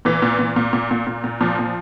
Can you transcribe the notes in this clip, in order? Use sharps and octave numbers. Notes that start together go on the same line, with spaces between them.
A#2 E3
A#2
A#2
A#2
A#2
A#2
A#2
A#2
A#2 F3
A#2